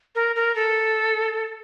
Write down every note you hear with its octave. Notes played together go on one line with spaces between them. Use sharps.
A#4
A#4
A4